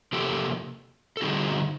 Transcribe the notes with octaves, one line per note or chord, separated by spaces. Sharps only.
C3 F3 A#3 G4 A4
A4
D3 G3 C4 D#4 F#4 G#4